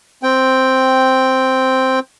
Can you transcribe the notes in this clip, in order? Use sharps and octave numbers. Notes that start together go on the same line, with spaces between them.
C4 G5